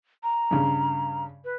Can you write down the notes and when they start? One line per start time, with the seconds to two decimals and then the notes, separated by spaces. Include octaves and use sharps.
0.23 A#5
0.51 G2 C#3
1.44 B4